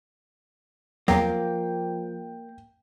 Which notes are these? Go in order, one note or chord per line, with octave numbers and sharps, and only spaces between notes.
E2 F3 F#3 A#3 G5